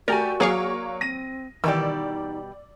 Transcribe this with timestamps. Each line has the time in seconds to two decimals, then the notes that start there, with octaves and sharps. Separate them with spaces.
0.08 A3 F#4 G4 A#4 D5 G#5
0.40 F#3 A#3 G#4 C#5 F5 C#6
1.01 C4 A#6 D#7
1.64 B2 D#3 E3 G3 D#4 G4 D5 E6